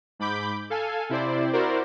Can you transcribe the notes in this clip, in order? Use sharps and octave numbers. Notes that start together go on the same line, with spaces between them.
G#2 B5 D6 G6
A4 F5 G#5
C3 E4 C5 D5
E4 F#4 A#4 C5 D5